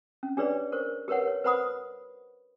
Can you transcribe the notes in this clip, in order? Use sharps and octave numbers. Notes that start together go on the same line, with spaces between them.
C#4
D4 G4 G#4 B4 C#5 D5
A#4 C5 C#6
G4 A#4 B4 C#5 F#5
C#5
B4 C5 F#5 B5 D#6